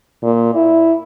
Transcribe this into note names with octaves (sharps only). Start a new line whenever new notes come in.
A#2
E4